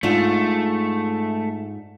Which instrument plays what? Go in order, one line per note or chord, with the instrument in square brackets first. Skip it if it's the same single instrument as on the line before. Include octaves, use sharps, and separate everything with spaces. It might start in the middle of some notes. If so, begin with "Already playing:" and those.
[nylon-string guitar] G#2 D4 F4 [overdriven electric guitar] A3